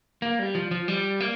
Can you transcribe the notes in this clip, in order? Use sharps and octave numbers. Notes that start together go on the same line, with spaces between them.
A#3
G3
F3
F3
G3
A#3